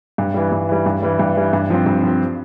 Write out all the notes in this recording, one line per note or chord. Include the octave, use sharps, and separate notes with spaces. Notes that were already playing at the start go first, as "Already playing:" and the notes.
G2
E3 G3
G2
E3 G3
G2
E3 G3
G2
E3 G3
G2
F3 C4
G2
F3 C4